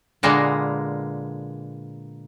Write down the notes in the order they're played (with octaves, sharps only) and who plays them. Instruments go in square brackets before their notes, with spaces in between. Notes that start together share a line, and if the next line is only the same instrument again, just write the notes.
[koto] A#2 D3 G#3 A#3 B3